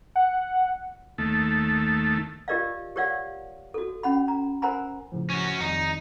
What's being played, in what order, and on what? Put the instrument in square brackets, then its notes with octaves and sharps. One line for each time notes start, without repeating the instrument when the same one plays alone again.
[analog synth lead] F#5
[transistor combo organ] D#2 A3
[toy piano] F4 G4 A#4 D5 D#5 F5
G4 A#4 C#5 D5 F5 F#5
F#4 A4
C#4 F#5 B5
A#5
A#4 C5 F#5 G#5 A#5 B5
[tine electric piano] A2 C#3 F3
[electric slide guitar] C#4 F#4
[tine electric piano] F2 D#3 G3 [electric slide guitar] D#4